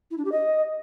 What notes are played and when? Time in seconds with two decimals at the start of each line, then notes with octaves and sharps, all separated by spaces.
0.11 E4
0.18 D4
0.25 G4
0.32 D#5